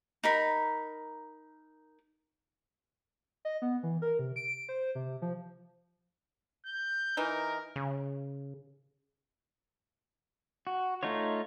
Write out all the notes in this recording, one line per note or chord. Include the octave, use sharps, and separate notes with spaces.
D#4 A#4 B5
D#5
B3
E3
A#4
C3
D7
C5
C3
F3
G6
E3 D#4 A#4
C#3
F#4
A3 D#4 F4 C#5